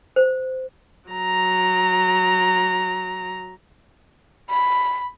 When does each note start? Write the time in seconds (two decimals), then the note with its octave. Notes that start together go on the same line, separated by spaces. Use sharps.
0.16 C5
1.09 F#3 A#5
4.50 B5